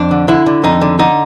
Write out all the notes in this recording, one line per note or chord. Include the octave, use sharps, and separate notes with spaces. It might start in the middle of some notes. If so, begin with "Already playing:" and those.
Already playing: F2 D4
D3
D3 E4
D3
F2 D#4
D3
D3 D#4